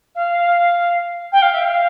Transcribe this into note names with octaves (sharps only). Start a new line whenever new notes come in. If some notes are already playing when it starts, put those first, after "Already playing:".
F5
G5
F5
E5
F5